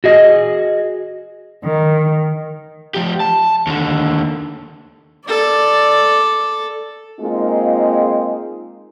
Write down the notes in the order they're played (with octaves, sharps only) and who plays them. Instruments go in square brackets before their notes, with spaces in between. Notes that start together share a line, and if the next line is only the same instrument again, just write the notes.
[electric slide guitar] F#4 G#4 D#5
[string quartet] D#3
[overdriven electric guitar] F3 G4
A5
D#2 D3
[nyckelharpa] A4 [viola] D5
[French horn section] G#3 A#3 C4 D#4 F4 G#4